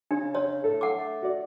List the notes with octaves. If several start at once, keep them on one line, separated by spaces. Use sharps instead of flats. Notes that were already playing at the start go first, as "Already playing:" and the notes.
C#3 D4
C#5
A2 A4
F#5 D6
A3
F#4 D5